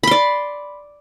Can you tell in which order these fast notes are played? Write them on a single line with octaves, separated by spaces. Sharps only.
B5 C6 D5